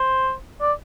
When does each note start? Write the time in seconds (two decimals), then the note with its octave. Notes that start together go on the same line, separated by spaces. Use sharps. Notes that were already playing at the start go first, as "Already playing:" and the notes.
Already playing: C5
0.61 D5